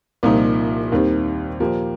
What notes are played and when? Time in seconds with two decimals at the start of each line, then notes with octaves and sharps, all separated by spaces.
0.23 C2 A#2 F3 A#3 D#4
0.92 D#2 D#3 G3 C4
1.60 A#2 F3 A#3 G4